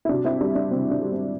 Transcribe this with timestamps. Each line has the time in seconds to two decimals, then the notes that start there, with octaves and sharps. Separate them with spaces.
0.05 E4
0.09 C3 D4 F#4
0.24 C4 E4
0.41 G3 D4
0.55 D4
0.71 C3 C4
0.91 D4
1.01 G3
1.12 C4